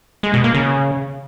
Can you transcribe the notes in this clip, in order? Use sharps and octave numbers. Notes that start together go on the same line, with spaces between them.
G#3
B2
A#3
C#3